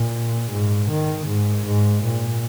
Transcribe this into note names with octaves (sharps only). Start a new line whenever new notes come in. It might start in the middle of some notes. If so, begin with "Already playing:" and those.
Already playing: A#2
G#2
D#3
G#2
G#2
A#2